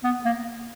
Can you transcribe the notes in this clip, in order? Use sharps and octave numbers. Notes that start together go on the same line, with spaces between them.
B3
A#3